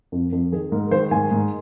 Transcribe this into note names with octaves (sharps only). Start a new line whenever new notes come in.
F2
F2
D#3 G#4
G#2 A#4
D#3 C5
G#2 G#5
G#2